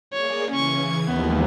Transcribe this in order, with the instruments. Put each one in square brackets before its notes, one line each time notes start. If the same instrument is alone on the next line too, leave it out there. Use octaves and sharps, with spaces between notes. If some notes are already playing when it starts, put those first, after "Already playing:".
[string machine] A#3 G#4 D5 [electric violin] C#5
[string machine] C#3 E3 G#6 [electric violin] C#4 C#6
[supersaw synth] D#2 [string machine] E3 F3 G#3 [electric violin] B3